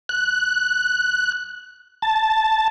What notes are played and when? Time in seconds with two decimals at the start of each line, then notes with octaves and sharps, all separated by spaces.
0.09 F#6
2.02 A5